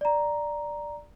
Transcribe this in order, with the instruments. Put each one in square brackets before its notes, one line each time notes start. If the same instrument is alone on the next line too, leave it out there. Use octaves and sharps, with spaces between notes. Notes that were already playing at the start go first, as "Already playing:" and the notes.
[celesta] D5 A#5